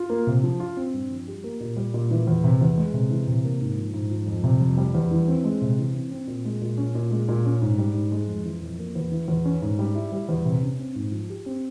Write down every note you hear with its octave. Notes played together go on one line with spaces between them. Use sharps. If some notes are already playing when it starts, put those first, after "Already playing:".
Already playing: F4
A#3
C3
F3
F4
C4
G2
F3
G4
A#3
A#2
G3
A#2
E3
E2
C3
E2
G#3
C3
E3
C3
A#3
G#2
F3
G#2
F3
F2
C3
F2
G3
E2
E3
C4
G#3
C3
E3
C4
C4
A#2
G#3
A#2
C#4
A#2
G#3
A#2
C#4
G#2
G3
G#2
G#3
F2
E3
F2
A#3
E2
E3
E2
C#4
G#2
G3
E4
G3
E2
C3
C#4
C4
G#2
F3
G4
C4